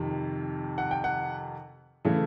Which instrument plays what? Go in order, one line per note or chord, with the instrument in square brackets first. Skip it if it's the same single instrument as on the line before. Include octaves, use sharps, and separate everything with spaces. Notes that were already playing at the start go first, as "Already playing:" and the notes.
Already playing: [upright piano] F2 C3 D#3
F#5
G5
F#5
C#3 E3 A3